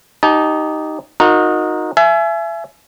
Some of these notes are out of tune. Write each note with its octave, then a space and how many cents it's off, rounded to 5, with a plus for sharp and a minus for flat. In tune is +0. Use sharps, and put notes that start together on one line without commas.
D#4 +0 G4 -15 A5 -30
D#4 +0 F#4 -30 A#4 +0
E5 +30 G#5 +30